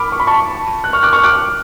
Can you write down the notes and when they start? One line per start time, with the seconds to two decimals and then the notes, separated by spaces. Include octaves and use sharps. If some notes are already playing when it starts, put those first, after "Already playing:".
Already playing: B5 D6 F6
0.12 C#6
0.20 B5
0.27 A5 C#6
0.84 F#6
0.93 C#6 F6
1.03 D6 F#6
1.13 C#6 F6
1.24 D6 F#6